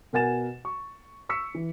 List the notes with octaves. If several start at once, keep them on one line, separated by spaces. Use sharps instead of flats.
B2 A#4 F#5 G#5 A6 E7
C#6
C#6 E6 B6 C#7
E3